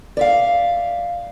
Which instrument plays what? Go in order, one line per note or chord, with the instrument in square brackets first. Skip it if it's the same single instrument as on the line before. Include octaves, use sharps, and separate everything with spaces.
[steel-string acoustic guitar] D5 E5 F5